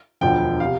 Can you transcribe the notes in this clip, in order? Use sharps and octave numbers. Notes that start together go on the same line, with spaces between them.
E1 D2 D3 F3 G5
C3 F5